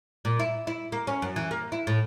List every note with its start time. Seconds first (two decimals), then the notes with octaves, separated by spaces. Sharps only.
0.25 A#2
0.39 E4
0.67 E4
0.92 A#3
1.07 C#4
1.22 F#2
1.36 E3
1.51 A#3
1.72 E4
1.87 A2